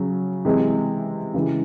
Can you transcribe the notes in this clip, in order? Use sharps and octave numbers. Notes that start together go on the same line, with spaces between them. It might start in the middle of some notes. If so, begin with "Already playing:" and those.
Already playing: C#3 F#3
C3 E3 G#3
C#3 E3 G#3